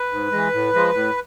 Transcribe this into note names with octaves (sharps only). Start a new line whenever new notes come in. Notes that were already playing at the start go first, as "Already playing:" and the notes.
Already playing: B4
G#2
E3 G#3
A2
F3 G#3
A2